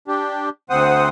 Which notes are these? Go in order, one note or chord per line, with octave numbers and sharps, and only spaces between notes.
D4 G4
D2 C4 C5 F#5 D#6